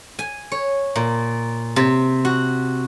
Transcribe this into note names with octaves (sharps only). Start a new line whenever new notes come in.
G#5
C#5
A#2
C3
F#4